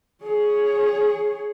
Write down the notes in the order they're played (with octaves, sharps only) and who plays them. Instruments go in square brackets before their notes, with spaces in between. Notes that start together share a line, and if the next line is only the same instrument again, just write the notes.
[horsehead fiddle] G#4 C#5